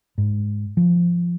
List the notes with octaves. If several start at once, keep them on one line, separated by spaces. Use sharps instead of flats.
G#2
F3